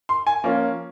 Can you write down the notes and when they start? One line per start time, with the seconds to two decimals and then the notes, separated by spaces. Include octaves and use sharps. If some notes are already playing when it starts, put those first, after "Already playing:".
0.09 C6
0.27 G#5
0.44 F3 A#3 C#4